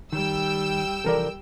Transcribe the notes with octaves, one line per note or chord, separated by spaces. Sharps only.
D#3 G3 G5 E6
C3 E3 F3 A4 A#4 D5